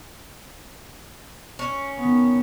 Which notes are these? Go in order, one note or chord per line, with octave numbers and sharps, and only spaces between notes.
C#4
D#3 B3